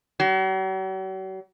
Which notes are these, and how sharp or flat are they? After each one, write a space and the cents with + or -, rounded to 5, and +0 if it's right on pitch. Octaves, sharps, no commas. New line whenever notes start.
F#3 +45